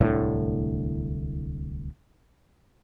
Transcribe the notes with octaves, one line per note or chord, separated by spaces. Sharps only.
D1 C2 A2 D3